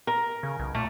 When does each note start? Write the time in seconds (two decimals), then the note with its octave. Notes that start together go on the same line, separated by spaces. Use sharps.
0.07 A#4
0.43 C#3
0.59 B1
0.75 A#2 A3